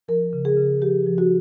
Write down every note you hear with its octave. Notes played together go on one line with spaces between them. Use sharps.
F3 A#4
C#3
G#4
C#3
F3 G4
F3
F#4